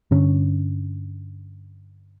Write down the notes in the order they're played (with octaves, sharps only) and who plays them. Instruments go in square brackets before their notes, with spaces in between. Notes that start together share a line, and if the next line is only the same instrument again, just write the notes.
[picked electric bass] G2 D3 C#4